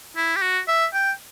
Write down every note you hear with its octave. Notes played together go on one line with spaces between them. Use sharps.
E4
G4
F#4
E5
G5